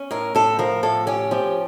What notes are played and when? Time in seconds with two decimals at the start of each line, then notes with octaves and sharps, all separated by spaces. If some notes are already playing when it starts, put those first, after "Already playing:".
Already playing: C#4
0.11 A2 A#4
0.35 A2 A4
0.59 F3 A#4
0.83 A2 A4
1.07 C#4 G4
1.31 F3 G4